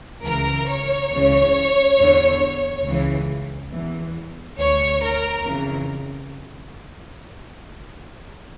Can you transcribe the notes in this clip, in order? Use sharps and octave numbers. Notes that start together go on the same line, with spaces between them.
C#2 C#3 E3 A#4
C#5
C#2 C#3 E3
E2 D3
C#2 C#3 E3
E2 E3
D2 D3 C#5
A#4
F2 C#3 E3